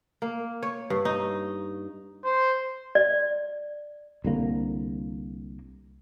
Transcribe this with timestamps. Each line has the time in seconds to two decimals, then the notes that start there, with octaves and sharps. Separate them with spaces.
0.22 A#3
0.63 C#5
0.90 G2
1.05 D#4
2.24 C5
2.95 D5
4.24 C2 D3 A#3